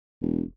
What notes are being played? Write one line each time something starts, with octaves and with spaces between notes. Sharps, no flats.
E1